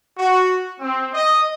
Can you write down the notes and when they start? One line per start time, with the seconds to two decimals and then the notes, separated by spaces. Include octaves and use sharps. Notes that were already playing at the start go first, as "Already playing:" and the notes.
0.18 F#4
0.80 C4
1.13 D#5